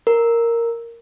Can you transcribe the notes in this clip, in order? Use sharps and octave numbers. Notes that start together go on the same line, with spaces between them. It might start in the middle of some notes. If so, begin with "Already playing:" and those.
A#4